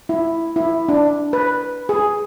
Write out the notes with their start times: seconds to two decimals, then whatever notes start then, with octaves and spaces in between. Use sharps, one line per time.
0.09 E4
0.56 E4
0.89 D4
1.33 B4
1.89 G#4